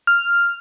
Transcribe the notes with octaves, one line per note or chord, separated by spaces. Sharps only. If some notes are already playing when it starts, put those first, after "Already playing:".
F6